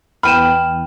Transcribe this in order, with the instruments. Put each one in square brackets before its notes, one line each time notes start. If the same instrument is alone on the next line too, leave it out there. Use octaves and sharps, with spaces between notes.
[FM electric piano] E2 E3 B3 [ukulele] G5 B5 [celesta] F6 D#7 E7